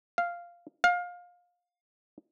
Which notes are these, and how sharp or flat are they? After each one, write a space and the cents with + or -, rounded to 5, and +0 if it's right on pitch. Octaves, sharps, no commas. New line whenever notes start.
F5 -5
F5 +25